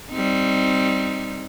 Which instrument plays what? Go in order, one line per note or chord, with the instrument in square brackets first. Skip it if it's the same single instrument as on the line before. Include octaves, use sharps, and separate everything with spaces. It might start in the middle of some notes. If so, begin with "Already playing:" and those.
[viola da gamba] G3 C4 D#4